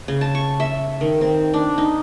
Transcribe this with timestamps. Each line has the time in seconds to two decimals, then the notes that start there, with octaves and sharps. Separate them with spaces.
0.08 C#3
0.21 A5
0.35 C#6
0.60 E5
1.01 D#3
1.21 C4
1.54 D4
1.78 D#4